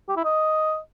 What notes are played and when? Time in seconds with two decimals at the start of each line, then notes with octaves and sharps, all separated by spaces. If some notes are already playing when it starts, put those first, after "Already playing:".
0.09 G4
0.17 E4
0.25 D#5